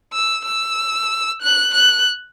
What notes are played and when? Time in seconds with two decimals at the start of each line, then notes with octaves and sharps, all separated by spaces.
0.13 E6
0.45 E6
1.42 F#6
1.74 F#6